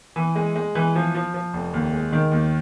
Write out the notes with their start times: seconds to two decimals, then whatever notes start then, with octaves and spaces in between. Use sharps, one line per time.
0.16 E3
0.36 G#3
0.56 G#3
0.75 E3
0.95 F3
1.15 F3
1.34 F3
1.53 F1
1.74 D#2
1.93 G#3
2.13 D#3
2.31 D#2